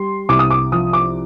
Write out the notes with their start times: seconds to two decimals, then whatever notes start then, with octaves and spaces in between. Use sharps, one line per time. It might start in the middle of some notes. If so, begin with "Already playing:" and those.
Already playing: G3 C6
0.29 C2 D6
0.39 D#6
0.50 D6
0.72 F3 D#6
0.93 D6